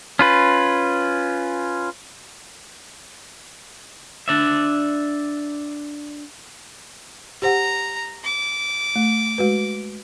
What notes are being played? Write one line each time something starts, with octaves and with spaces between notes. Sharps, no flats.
C#4 F4 B4
D4 D5 E5
G4 C5 F#5 A#5
D6
A3
G#3 F#4 B4